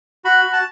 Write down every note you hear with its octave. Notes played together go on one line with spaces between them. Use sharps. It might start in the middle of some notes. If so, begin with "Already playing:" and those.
F#4 B5
F#4
A5